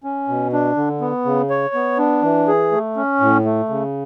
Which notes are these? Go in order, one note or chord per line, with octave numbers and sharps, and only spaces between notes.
C#4
B2
D4
D3
B3
C#3
C#5
B3
D4
E3
G#4
A3
C#4
A2
A3
C#3